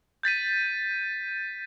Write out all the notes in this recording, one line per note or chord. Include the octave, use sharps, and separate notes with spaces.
G6 A6 B6 D#7